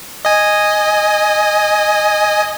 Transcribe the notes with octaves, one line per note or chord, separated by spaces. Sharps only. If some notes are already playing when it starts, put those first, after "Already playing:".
D#5 G#5